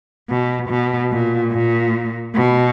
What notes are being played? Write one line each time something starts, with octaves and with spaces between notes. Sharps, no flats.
B2
B2
A#2
A#2
B2